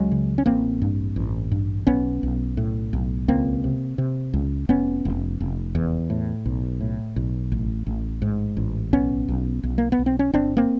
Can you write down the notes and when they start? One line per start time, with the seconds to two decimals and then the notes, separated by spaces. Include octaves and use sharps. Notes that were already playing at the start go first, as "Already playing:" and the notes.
Already playing: C#2 F#3 G#3
0.11 C#3
0.38 C#4
0.46 A1 A#3 C4
0.82 G2
1.16 A1
1.52 G2
1.87 B1 B3 C#4
2.23 B1
2.57 A2
2.93 B1
3.28 C#2 A#3 C4
3.64 C3
3.98 C3
4.33 C#2
4.69 F1 B3 C#4
5.05 F1
5.40 F1
5.75 E2
6.10 A2
6.46 B1
6.81 A2
7.16 B1
7.52 A1
7.87 A1
8.22 G#2
8.57 A1
8.93 B1 B3 C#4
9.28 B1
9.63 B1
9.78 A#3
9.92 B3
9.99 B1
10.06 C4
10.19 C#4
10.33 G1 C4 D4
10.57 A#3 C4